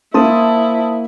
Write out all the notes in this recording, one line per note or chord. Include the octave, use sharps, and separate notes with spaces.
A#3 E4 C5 A5 D#6